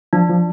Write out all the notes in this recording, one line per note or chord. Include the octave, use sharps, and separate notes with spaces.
F3 D4
F3